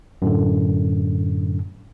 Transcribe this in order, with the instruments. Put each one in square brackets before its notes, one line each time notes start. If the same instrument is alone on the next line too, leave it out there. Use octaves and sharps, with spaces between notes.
[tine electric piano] F#2 A2 D3